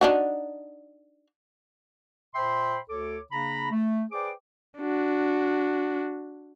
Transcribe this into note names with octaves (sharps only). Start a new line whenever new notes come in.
D4 D#4 F#4
A#2 C5 E5 G5 B5 C6
D2 A4 C#5 D6
C#3 A#3 D4 A#5 B5
A3
G#4 B4 C5 D5 G5 D6
D4 F#4